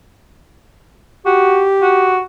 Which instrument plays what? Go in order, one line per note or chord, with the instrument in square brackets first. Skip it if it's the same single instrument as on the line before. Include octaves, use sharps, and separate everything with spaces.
[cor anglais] F#4 [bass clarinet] G4
[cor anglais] F#4